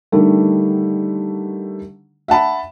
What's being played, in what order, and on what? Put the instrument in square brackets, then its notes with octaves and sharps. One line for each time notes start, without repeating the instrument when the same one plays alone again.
[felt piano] D3 D#3 G3 A3
E5 F#5 A5 B5